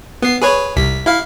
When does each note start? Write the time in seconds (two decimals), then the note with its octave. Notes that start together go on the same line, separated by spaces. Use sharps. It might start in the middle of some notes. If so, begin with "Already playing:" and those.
0.22 B3 C7
0.42 G#4 B4 C#5
0.76 C2 B6
1.06 E4 F5